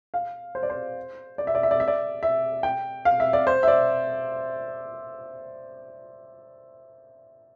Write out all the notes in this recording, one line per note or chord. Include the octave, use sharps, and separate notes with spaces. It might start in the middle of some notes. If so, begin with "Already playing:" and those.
F5
C5
D5
C5
D5
E5
D5
E5
D5
E5
D5
E5
G5
F5
E5
D5
C5
E5
D5